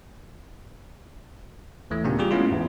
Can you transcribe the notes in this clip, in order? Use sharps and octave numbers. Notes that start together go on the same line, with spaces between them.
D#2 E3 A3
A#2 C#3 A#3 B3 D4 G4
G3 F4 G4 G#4
G#3 A3 B3 C#4 E4 F4
E2 G#2